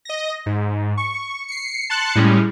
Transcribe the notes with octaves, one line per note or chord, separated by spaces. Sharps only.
D#5 A#6
G#2
C#6
C7 C#7
A5 C6 F#6 C#7
A2 G3 G#3 C#4